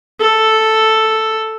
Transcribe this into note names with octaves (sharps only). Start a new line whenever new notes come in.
A4